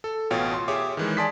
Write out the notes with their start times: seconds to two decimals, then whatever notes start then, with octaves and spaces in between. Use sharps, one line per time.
0.04 A4
0.31 A1 B2 F4 C#5 F5 G5
0.54 C6
0.68 G4 G#4 C#5 E5 G#5 D6
0.97 D#3 E3 G#3
1.17 D5 G#5 A5 C6 D#6 B6